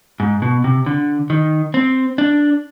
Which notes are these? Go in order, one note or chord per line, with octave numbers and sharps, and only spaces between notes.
G#2
B2
C3
D3
D#3
C4
D4